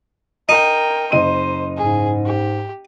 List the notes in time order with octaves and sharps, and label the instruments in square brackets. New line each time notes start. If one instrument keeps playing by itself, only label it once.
[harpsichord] D#4 [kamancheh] A#4 G5
[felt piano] F#1 D#5 D#7 [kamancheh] C5
[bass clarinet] G#2 [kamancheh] G#4
[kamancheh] G4